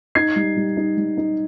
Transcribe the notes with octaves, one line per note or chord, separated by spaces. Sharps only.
D#4 G#6 C7
G3
G3
D#4
G3
D#4